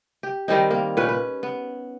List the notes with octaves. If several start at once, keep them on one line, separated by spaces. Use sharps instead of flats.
G4
D#3 G3 C4 D#4
A#3
A#2 C#4 B4
B4
B3